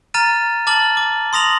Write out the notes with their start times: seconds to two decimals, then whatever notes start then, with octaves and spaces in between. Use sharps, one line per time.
0.14 A#5 F6 A6 D#7
0.67 A5 D6 F6 A6 F#7
0.97 D6
1.33 C6 D#6 A#6 F7 F#7